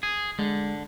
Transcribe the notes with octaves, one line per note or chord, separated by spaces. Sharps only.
G#4
D3 G#3